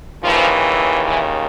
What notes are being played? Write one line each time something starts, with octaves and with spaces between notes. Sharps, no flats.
D#2 C#3 E3 F3
E3